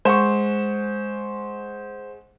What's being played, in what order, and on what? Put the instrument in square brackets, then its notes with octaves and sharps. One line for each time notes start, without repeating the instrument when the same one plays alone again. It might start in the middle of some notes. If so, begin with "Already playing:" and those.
[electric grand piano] G#3 E7 [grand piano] C5 F#5 C#6